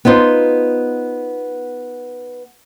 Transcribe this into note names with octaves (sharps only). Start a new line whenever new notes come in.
B3 D#4 F4 C5